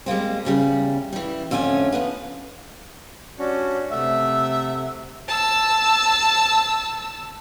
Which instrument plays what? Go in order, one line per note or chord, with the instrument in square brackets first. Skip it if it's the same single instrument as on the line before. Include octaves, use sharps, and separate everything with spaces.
[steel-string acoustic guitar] G3 G#3 A#3 C4
E2 C#3 G3
E3 G3
F2 D3 A3 C#4 G#5
F3 B3 B4
[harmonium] G3 [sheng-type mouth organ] C#4 D4 F#4
[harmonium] C3 F#5 [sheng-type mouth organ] A3 [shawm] E5
[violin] A5 E6